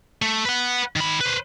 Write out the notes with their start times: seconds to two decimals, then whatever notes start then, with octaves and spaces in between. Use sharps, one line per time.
0.22 A3
0.45 B4 F#5
0.96 D#3 B5
1.21 B4 C5